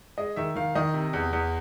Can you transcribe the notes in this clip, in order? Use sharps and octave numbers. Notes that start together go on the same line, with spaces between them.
G#3 D#5
D#3 E5
D#3 F5
D#3 D#5
C3
E2
E2